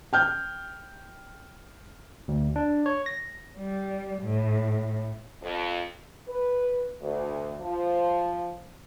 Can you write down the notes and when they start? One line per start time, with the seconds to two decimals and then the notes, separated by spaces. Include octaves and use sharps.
0.13 G5 F6 G6
2.28 D2
2.56 D4
2.86 C#5
3.06 A#6
3.58 G3
4.23 A2
5.42 F2
6.28 B4
7.01 D2
7.61 F3